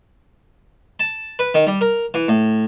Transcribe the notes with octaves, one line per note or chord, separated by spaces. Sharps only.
A5
B4
D#3
G3
A#4
E3
A2